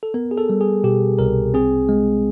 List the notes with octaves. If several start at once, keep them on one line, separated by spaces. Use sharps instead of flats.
A4
B3 A#4
G#4
A4
G3
G#4
B2 G4
C2 A#4
C4 G#4
G#3